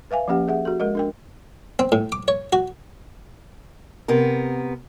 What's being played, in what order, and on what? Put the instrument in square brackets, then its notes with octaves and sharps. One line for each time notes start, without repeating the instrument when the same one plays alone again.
[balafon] B4 E5 F5 G#5
F3 A#3 C#4 G4 F#5
G#4 E5 F#5
F#4 A4
G#3 A#4 D#5
D4 A#4 G5
[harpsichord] C4
A2
D6
C#5
F#4
[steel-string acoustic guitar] C3 B3 A#4